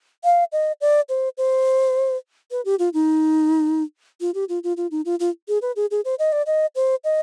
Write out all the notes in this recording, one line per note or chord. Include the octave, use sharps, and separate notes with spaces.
F5
D#5
D5
C5
C5
B4
G4
F4
D#4
F4
G4
F4
F4
F4
D#4
F4
F4
G#4
B4
G#4
G#4
C5
D#5
D5
D#5
C5
D#5